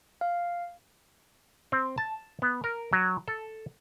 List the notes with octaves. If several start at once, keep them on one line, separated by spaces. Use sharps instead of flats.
F5
C4
A5
B3
A#4
F#3
A4